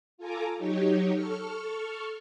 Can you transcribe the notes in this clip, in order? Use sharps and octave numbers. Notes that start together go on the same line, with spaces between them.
F4 A4 G#5 A#5 D6
F#3 D#4 G4 C#5
A4 C#6 F6